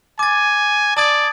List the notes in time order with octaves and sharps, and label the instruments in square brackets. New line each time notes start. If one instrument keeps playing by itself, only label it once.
[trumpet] G#5 [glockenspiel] D6 A6
[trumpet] D5 [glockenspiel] A5 D#6 G#6